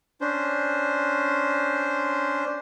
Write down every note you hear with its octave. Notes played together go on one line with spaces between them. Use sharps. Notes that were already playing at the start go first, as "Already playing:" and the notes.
C#4 D4 C5